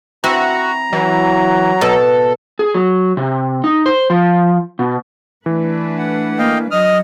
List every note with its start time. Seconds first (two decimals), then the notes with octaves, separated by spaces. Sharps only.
0.24 C4 E4 F#4 A#5
0.93 E3 F#3
1.81 B2 A4
2.59 G#4
2.74 F#3
3.17 C3
3.64 D#4
3.86 C5
4.10 F3
4.79 B2
5.46 E3 A3 D4 B4
5.98 F#5
6.39 A#3 D#5 F5 G5
6.71 F#3 D#5 D#6 F6